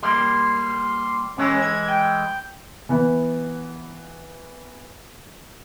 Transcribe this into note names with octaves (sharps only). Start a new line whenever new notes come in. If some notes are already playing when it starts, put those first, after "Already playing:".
G3 A#3 C6
E3 G#3 C#4 E4
G#6
G5
E3 B3